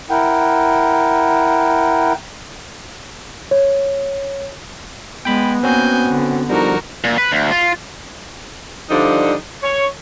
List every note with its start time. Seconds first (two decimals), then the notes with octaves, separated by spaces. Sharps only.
0.10 E4 A#4 F#5 G5
3.51 C#5
5.25 G#3 B3 G5 B5
5.63 A#3 C4 C#4 F#4 G#5 G6
6.10 D3
6.50 D3 F3 G3 D#4 F#4 A#4
7.04 A#2
7.18 B4
7.31 D2
7.51 F4
8.90 D3 F3 G3 D4 D#4
9.63 C#5